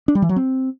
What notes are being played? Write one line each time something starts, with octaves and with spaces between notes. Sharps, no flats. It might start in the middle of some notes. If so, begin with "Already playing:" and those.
D4
G3
E3
F#3
C4